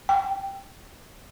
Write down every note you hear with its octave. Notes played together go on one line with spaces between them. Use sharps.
G5